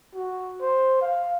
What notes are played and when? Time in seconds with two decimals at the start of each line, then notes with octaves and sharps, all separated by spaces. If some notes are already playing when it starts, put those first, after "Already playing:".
0.15 F#4
0.61 C5
1.02 F5